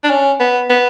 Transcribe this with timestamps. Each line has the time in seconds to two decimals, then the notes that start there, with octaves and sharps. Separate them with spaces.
0.04 D4
0.10 C#4
0.40 B3
0.70 B3